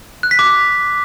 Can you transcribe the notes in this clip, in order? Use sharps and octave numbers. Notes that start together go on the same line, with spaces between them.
F#6
B6
D6